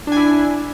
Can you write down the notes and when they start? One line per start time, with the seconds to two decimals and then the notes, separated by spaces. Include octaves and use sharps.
0.07 D4
0.12 G#5
0.17 E4